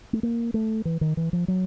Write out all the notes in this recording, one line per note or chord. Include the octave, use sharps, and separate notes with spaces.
A3
A#3
A3
E3
D#3
E3
F3
F#3